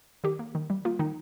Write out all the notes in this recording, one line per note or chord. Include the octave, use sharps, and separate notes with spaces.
D#3 G4
A#3
D#3
G3
A#3 F4
D#3 D#4